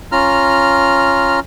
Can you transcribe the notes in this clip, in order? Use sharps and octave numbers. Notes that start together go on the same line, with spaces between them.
C#4 F4 A#5 F6